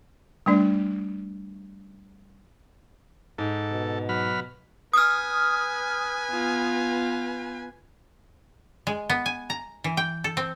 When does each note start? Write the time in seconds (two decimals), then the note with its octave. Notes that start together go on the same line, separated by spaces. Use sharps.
0.46 G3 A3 D4 D5
3.38 G#2 A4
3.71 B2
4.09 F#3 B5 F6
4.93 B4 G#5 D#6 F6
6.31 B3 F4
8.87 G#3
9.10 B3
9.26 G#5
9.50 A#5
9.84 E3
9.97 G5
10.24 A4
10.37 C4